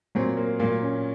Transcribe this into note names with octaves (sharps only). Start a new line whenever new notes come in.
A#2 F#3 C4
A#3
A#2 F#3 A#3
C#4